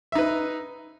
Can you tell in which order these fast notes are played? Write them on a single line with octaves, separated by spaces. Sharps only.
E5 D#4 B4